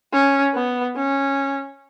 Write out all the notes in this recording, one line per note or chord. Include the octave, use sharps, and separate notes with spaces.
C#4
B3
C#4